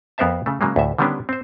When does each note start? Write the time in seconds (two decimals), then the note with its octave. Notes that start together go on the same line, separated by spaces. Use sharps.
0.18 F2 B3 A#4 C5 E5 A5
0.46 C#3 A3
0.61 C#3 F#3 G#3 A#3
0.76 D2 A2 E5
0.98 D3 D#3 G3 B3 C#4 D4
1.29 C4 C5